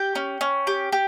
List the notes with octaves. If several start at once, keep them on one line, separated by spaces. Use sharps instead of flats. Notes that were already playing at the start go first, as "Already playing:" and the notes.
Already playing: G4 G5
C#4
C#4
G4
G4